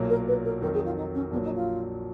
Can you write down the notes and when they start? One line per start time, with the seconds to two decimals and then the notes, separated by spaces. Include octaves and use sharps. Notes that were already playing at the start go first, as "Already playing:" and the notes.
Already playing: B1 A#2 F#3 A#3
0.09 A#4
0.27 B4
0.44 A#4
0.62 F2 D#3 F#3 A#4
0.73 G#4
0.85 F4
0.97 D#4
1.14 C#4
1.31 A#1 A#2 F#3 B3
1.43 D#4
1.55 F4